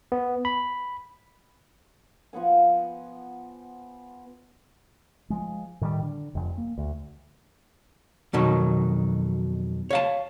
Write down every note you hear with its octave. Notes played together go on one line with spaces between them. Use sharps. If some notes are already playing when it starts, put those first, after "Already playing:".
B3
B5
F3 B3 F#5 G#5
F3 G#3
A2 D#3 E3 G3
D3
F1 F2
A#3
D2
F2 B2 D#3 F#3
C#5 F5 A5